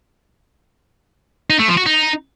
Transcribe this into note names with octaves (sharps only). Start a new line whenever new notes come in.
D#4
A3
F3
F#4
D#4